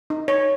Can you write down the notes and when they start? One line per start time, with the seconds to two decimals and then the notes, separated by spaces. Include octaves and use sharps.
0.10 D#4
0.28 C#5